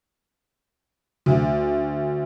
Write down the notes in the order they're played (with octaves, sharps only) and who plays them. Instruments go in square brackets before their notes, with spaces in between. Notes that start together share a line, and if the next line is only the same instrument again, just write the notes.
[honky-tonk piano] D2